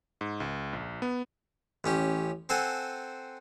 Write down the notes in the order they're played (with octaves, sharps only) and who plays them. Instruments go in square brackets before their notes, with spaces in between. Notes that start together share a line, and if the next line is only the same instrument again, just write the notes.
[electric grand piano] G#2
C#2
A#1
B3
[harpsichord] A1 C#4 G4
C4 A4 C5 F#5 G#5